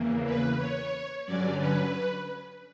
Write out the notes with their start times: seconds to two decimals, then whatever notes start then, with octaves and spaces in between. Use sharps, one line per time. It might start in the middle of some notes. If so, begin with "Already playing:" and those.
Already playing: E2 C#3 E3 A#3
0.25 B4
0.58 C#5
1.25 G2 D3 F#3 C#4 D5
1.59 B4